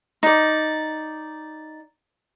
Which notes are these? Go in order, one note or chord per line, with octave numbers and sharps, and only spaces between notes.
D#4 D5